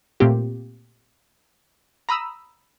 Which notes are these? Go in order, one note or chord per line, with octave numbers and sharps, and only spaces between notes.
A#2 A3 A#3 C4 G4
A#5 B5 D#6 E6